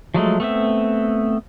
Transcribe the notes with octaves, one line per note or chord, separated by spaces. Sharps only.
F3 F#3 G#3 A3
A3 B3 C4 E5